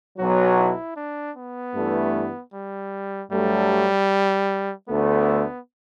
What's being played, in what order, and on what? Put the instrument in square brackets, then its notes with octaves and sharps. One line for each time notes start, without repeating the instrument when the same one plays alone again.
[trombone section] B1 B2 F#3 [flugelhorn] F#4
[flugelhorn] E4
D4
B3
[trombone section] G2 E3 A3
[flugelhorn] G3
[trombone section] G2 F#3 A3 [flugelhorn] G3
[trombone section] D2 D3 A3 [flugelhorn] B3